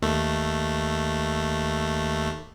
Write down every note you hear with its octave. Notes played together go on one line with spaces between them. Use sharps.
D#2 A3